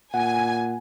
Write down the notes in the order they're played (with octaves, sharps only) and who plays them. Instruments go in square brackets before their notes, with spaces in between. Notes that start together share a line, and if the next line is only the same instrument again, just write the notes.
[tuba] A#2 [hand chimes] F#5 [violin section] G#5